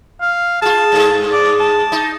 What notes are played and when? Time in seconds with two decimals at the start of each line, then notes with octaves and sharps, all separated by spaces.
0.21 F5
0.62 F4 G#4 A5
0.92 G2 G#4
1.33 D5
1.60 A5
1.92 D#4